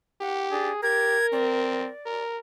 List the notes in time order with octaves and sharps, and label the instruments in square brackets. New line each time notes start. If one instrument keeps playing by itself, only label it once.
[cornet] G4 [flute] F#5
[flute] D4 [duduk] G#4
[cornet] G4 [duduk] A#4 [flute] G#6
[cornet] C4 [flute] D5
[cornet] A#4